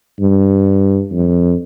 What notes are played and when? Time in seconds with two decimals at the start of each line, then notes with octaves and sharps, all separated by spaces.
0.20 G2
1.12 F2